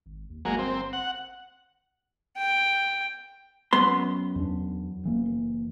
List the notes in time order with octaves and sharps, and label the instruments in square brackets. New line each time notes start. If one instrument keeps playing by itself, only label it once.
[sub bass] G#1
D#2
[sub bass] G1 [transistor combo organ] F#3 G#3 A#3
[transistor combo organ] C4
F#5
[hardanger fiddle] G5
[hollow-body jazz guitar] F#2 B3 C6
[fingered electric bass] E2 D4
F#1 E3 A#3